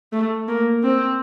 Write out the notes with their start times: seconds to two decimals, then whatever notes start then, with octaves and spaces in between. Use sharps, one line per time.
0.13 A3
0.48 A#3
0.83 C4